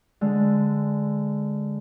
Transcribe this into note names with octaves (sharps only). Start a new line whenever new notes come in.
D3 G#3